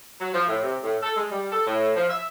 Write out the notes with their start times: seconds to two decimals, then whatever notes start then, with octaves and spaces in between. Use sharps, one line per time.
0.21 F#3
0.34 F3
0.48 A2
0.62 C3
0.83 A2
1.02 A4
1.16 G#3
1.30 G3
1.51 A4
1.67 A2
1.96 F3
2.09 E5